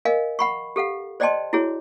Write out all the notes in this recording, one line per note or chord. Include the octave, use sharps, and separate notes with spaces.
A#4 D#5 F5 G#5
F#5 B5 C#6
G4 A4 F5 F#5
C5 D5 D#5 G5 A5 C6
E4 F#4 G#4 C#5